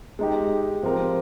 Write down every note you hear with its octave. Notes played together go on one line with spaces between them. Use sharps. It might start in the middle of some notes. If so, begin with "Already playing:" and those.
G#3 D#4 G4
F3 C4 G4 A#4